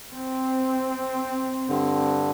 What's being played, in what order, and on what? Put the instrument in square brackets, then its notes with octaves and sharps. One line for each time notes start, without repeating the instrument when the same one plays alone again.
[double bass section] C4
[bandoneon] G2 D3